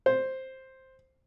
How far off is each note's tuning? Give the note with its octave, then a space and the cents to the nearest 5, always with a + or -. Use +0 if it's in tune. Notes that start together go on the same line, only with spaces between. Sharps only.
C5 +5